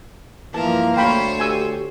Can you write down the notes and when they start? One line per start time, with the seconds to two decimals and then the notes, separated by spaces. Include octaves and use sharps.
0.54 G2 E3 F3 A#3 A#4 A5
0.97 D2 A4 C5 C#5 G5 B5
1.40 G4 G#5 E6